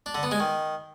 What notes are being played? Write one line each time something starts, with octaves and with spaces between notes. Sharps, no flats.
D4
D3
B3
G#3
D#3